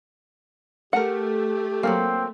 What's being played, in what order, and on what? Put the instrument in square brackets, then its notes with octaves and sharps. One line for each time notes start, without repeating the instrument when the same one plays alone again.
[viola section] A3 [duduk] G4 [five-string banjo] A#4 F#5
[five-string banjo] F#3 G3 A#3 [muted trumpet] C4